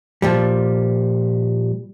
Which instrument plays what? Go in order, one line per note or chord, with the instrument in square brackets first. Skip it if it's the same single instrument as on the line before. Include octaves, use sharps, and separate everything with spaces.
[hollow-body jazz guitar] A#2 F3 G3